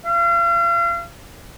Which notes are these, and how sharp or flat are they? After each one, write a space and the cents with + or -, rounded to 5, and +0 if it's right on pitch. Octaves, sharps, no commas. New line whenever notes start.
F5 -40